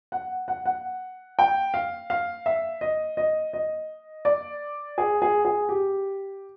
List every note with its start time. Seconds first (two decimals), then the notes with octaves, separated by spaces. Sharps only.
0.12 F#5
0.48 F#5
0.65 F#5
1.39 G5
1.74 F5
2.10 F5
2.46 E5
2.81 D#5
3.17 D#5
3.53 D#5
4.25 D5
4.98 G#4
5.22 G#4
5.45 G#4
5.69 G4